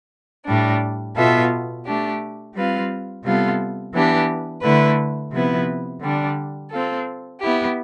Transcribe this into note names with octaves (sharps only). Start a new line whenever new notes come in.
A2 G3 D4
B2 B3 F4 A4 E5
A3 D4 G4
G3 C4 F4 B4 F5
C3 G3 B3 F4 A4
E3 B3 D4 G4
D3 A3 E4 B4
C3 F3 B3 E4 B4
D3 G3 D4
C4 F4 A4
B3 E4 G4